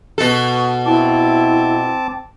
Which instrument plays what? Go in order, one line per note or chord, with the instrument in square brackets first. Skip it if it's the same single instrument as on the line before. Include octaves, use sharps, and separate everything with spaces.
[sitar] B2 A4
[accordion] C4 A5 D6 [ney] E4